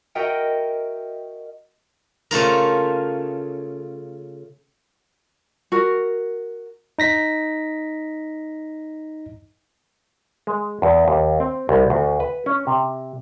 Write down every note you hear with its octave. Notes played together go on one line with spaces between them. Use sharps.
F#4 A#4 D#5 E5 G5
C#3 A3 F4 A#4
F#4 A#4
D#4 A#6 B6
G#3
E2
D#2
C4
C2
D2
B4
C#4
C3